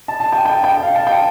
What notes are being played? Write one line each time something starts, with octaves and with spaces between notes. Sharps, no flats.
A5
A5
G5
G5
G5
F5
A5
G5